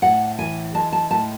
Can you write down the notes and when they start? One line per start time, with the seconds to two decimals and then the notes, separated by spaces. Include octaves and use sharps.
0.02 A2 F#5
0.39 E3 G#5
0.74 G#3 A5
0.92 A5
1.11 A2 A5